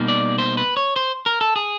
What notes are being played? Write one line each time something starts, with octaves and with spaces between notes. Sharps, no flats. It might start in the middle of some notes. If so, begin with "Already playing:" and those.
Already playing: B2 G3 A#3 D#4
D5
C5
B4
C#5
C5
A#4
A4
G#4